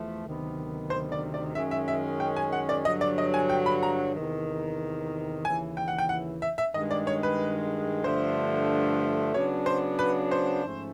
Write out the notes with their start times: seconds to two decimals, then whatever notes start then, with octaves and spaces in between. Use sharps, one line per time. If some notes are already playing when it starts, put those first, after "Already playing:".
Already playing: E2 F3 A3
0.25 D2 C3 D#3 F#3 B3
0.90 C5
1.12 D5
1.34 D5
1.55 F#2 D#3 G#3 C#4 E5
1.71 E5
1.88 E5
2.20 G5
2.36 G#5
2.52 F#5
2.69 D5
2.85 G2 D3 F#3 D#5
3.01 D5
3.18 D#5
3.34 G#5
3.49 G5
3.66 B5
3.83 A#5
4.15 E2 C3 D#3
5.45 D#2 C#3 E3 G#5
5.77 G5
5.88 F#5
5.98 G5
6.09 F#5
6.42 E5
6.58 E5
6.74 G2 D#3 G#3 D#5
6.91 D5
7.07 C#5
7.23 B4
8.04 G2 D3 F3 A3 C5
9.34 C#3 F#3 B3 D4 C#5
9.66 C5
9.99 B4
10.31 C5
10.64 G#2 F3 A3 C#4